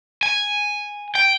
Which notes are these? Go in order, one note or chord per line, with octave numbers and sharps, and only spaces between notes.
G#5
G5